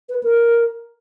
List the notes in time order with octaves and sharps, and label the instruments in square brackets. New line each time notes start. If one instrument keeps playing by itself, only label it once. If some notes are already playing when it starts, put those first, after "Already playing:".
[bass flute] B4
A#4